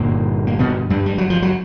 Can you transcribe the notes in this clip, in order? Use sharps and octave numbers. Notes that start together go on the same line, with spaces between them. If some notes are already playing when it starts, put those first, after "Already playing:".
Already playing: G1 G2 A#2 D3 A#3
A#3
B2 B3
G2 G3
G3
F#3
F3
F#3